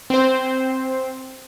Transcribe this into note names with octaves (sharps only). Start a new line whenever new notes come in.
C4 C5